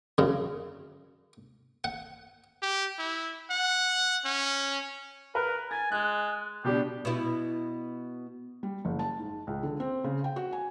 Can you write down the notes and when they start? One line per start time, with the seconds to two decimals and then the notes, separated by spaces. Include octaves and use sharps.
0.18 F#2 C#3
1.84 F#5
2.62 G4
2.98 E4
3.50 F#5
4.25 C#4
5.35 A#4 B4
5.71 G#5 A6
5.92 G#3 F#6
6.64 B2 G3 D4 G4
7.05 B2 E4
8.63 G3
8.85 F#1
8.99 A5
9.19 G#2
9.47 C#2
9.63 D3
9.80 C4
10.04 C#3
10.24 G5
10.36 F#4
10.52 G#5